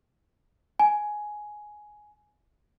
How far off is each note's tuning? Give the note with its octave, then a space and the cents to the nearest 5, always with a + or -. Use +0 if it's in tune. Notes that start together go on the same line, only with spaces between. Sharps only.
G#5 +10